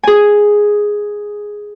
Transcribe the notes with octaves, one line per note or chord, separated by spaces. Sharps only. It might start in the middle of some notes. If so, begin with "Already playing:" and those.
G#4 G#5